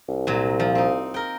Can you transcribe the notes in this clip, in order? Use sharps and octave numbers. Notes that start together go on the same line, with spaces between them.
C2
A#2 F#3
F3
C4 D#4
A#4 G5